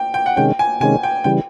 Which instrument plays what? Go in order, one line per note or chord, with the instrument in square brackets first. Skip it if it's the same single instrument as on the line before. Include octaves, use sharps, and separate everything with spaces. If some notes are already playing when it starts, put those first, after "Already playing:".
Already playing: [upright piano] G5
G5
F#5
[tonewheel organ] C3 D#3 G#3 C#4 [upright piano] G5
[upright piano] G#5
[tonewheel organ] C3 D#3 G#3 C#4 [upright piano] G#5
[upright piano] G5
[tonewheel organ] C#3 E3 G3 [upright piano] G5